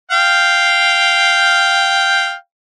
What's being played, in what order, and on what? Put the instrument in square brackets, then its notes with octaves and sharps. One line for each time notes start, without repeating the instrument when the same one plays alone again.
[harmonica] F5 G5